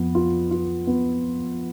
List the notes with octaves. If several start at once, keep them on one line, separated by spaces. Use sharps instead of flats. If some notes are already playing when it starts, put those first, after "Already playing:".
Already playing: F2 B3
F4
F4
B3